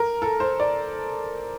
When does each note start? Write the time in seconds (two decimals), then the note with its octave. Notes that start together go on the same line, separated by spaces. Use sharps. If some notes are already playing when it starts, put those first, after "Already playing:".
Already playing: A#4
0.22 A4
0.40 C5
0.60 D5